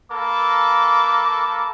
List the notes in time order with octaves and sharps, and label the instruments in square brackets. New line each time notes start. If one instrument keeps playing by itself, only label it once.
[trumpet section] A#3 A4 B4 D6